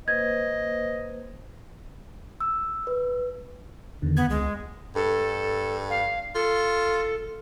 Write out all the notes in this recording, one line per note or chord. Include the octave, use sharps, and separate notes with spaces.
A#3 B4 C5 D#5 G#6
E6
B4
E2 D3 D#3
B3 G#6
C#2 G#3
G2 A4
F5
F4 A4